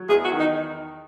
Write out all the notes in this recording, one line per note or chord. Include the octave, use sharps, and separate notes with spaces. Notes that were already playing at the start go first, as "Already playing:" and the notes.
Already playing: F#3
E2 G#4
F#4
D#3
D#4